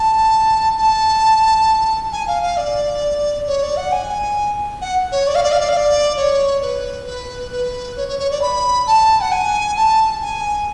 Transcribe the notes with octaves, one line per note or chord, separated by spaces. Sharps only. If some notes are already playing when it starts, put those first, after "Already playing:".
Already playing: A5
A5
G#5
F5
F5
D5
C#5
D5
F#5
G#5
F#5
C#5
D5
F5
D5
F5
D5
F5
D5
C#5
B4
B4
B4
C#5
C#5
C#5
D5
B5
A5
F#5
G#5
A5
G#5